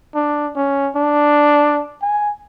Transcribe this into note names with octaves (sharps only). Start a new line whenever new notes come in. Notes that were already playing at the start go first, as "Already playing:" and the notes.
D4
C#4
D4
G#5